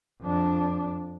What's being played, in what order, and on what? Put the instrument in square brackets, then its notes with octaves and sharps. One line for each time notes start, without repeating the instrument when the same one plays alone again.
[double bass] F2 D4